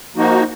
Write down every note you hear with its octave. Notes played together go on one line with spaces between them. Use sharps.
F3 A#3 D#4 F#4